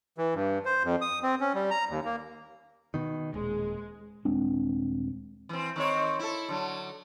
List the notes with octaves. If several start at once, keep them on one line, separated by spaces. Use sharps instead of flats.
E3
G2
C5
F2
D#6
C4
C#4
G3
A#5
D#2
A#3
B2 D#3
D#1 G#3
D#1 G#3 C4 D4
E3 C4
D#3 C4 C#5
E4 A4
D3 F#3